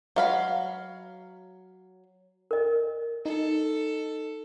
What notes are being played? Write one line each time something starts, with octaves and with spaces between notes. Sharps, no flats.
F#3 F5 B5
A#4 D#5
D#4 A4